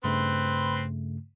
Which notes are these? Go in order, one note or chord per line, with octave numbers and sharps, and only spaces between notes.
G2 C#3 A3 C4 B4 C6